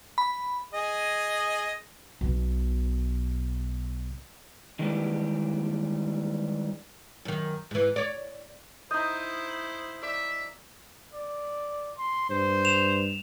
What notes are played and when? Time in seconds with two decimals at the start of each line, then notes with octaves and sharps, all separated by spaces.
0.18 B5
0.74 G#4 D#5
2.21 B1 B2
4.79 D#3 E3 G3 G#3 G4
7.25 F#2 D#3
7.71 G#2 E3
7.96 C#5 D5
8.91 D#4 E4 C5 D#5 D#6 G6
10.03 D5 E5
11.13 D5
11.98 C6
12.30 G2 C5
12.65 E7 F7